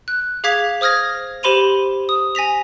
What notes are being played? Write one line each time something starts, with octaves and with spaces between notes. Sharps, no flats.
F#6
G#4 F5 D6 G#6 B6 F7
C5 D#6 F6 G#6 A#6
G4 C5 B5 C6 D#7 F7
D#6
G#5 A#6 B6 F7